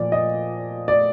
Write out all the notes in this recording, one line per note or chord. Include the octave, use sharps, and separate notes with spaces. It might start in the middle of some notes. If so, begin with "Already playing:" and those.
Already playing: A#2 F3 D5
D#5
D5